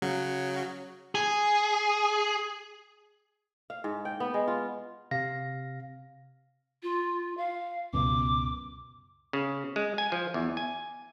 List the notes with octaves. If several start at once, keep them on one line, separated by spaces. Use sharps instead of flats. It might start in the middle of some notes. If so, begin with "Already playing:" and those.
C#3 F#3
G#4
F5
G#2
G5
B3
G#3
F4
C3 F5 A#6
F4
F5
C#2 F#2 B2 D6
C#3
G#3
G#5
F3
E2
G#5